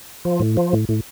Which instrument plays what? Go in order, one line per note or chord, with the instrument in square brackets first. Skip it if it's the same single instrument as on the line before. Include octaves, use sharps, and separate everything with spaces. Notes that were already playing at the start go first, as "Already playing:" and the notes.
[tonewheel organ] F3
A2
F3
A2
A2